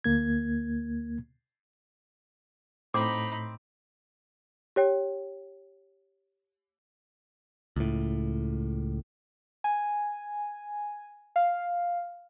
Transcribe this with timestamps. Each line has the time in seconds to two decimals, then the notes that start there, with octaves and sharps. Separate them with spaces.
0.04 D2 A#3 G#6
2.94 A2 C4 D#4 B5 D6
4.76 G4 C#5 G5
7.76 C#2 A2
9.64 G#5
11.36 F5